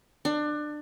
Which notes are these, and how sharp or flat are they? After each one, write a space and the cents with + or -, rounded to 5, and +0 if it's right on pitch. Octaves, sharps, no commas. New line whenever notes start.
D4 +25